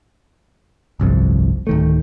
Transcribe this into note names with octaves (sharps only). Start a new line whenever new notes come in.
G1 C2 F2
D1 D#3 A3